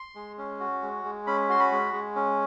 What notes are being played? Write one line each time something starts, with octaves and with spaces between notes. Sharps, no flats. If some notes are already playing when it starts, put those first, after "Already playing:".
Already playing: C6
G#3
C#4
F#4
G#3
G#3
C#4 B5
F#4 C6
B5
G#3
G#3
C#4